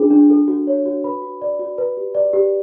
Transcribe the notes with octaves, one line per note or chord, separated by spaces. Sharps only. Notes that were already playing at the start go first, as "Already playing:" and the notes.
Already playing: D4 F4 G#4
D4
A4
F#4
C#5
F#4
B4 B5
F#4
D5
F#4
B4
G4
D5
G4